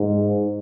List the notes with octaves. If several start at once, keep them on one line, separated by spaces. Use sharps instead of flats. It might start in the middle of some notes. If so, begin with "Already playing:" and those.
Already playing: G#2